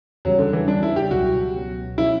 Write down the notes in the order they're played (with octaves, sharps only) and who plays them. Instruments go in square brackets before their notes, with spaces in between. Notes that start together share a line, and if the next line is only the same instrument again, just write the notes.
[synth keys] E2 C#3 G3 [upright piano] F#3
[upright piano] D3
E3
[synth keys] E2 C#3 G3 [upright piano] D4
[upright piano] E4
G4
[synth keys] C#2 B2 F#3 [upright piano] F#4
[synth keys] C#2 B2 F#3
[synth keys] B2 F#3 C#4 [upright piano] E4